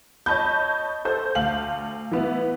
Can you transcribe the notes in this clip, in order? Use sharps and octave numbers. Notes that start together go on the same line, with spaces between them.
C#5 D#5 A5 B5 G6
A4 C5 G6
D2 F5 F#7
E3 B3 E4